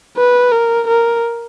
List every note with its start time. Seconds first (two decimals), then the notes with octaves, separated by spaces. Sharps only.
0.17 B4
0.52 A#4
0.88 A#4